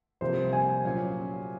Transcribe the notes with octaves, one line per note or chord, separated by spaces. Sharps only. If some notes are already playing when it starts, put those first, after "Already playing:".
C2 C3 F3 A#3 F4 C5
G#5
A#2 F#3 C#4 F4